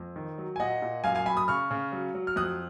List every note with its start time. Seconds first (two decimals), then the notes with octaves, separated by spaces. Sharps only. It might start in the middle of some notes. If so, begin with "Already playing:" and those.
Already playing: F2
0.16 D#3
0.38 F#3
0.56 G#5
0.60 A#2 D#5 F#5
0.82 A#2
1.04 F#2 F5 G#5
1.15 F5 G#5
1.26 F#2 G#5 B5
1.37 B5 D#6
1.48 C#3 C#6 F6
1.71 C#3
1.92 F#3
2.15 F#3
2.27 F6
2.36 F2 D#6 F#6